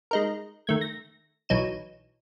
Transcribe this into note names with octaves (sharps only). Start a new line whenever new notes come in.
G#3 D#4 A#4
D#3 A3 G#6
A#6
B1 E3 F#3 D#4 D#7 E7